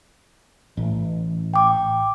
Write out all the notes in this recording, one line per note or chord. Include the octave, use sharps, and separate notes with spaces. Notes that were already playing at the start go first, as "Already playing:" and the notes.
A1
G5 D6